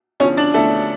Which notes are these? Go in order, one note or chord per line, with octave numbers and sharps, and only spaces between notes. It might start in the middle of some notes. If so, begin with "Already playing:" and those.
E2 D3 F3 C#4 C#5
D4 D5
E2 D3 F3 A3 A4